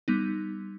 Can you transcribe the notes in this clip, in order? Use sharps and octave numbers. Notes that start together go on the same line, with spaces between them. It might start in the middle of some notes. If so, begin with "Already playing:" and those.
G3 B3 D#4